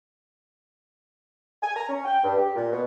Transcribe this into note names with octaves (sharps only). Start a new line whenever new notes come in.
G#5
A#5
C#4
G5
G2
G4
A#2
B2